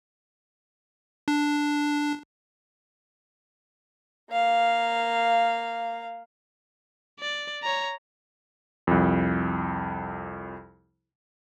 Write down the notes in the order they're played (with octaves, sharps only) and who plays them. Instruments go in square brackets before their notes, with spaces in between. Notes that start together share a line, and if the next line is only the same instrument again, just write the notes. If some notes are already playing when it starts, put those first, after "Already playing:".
[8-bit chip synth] D4
[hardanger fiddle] A#3 F5
[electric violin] D5
C#5 A#5
[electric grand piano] C2 F2